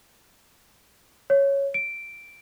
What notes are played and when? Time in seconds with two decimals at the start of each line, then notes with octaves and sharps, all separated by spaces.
1.30 C#5
1.74 D7